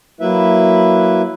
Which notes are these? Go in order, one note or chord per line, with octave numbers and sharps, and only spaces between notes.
F#3 A#3 E4 B4 E5